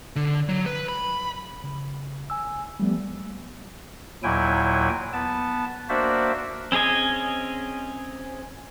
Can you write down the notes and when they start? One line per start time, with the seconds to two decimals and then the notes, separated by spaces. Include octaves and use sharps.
0.16 D3
0.49 F#3
0.66 B4
0.89 B5
1.64 C#3
2.30 G#5 E6
2.80 F3 G3 A3 B3
4.23 D#2 A#2 F#3 E4 G5 G#5
5.13 B3 A5
5.89 A#3 D4 F#4 C5 D5 E5
6.72 C4 C#4 G#4 D#5 G#5